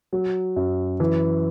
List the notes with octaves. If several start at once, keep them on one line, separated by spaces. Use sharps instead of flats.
F#3
F#2
E3